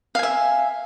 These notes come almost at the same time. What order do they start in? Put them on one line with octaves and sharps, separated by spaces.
F5 G#5 E5